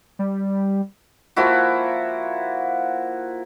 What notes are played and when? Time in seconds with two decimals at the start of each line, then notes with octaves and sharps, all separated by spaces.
0.19 G3
1.36 F3 A#3 E4 F#4